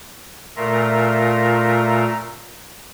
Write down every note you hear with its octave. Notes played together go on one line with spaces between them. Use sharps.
A#2 A3 F4 A#4 E5 A#5